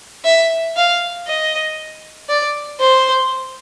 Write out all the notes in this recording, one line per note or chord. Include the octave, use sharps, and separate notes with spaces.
E5
F5
D#5
D5
C5